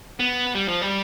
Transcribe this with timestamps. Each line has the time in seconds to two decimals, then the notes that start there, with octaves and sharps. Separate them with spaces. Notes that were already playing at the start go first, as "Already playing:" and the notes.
0.20 B3
0.55 G3
0.68 F3
0.81 G3